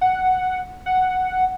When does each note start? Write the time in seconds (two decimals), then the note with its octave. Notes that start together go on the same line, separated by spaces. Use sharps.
0.01 F#5
0.86 F#5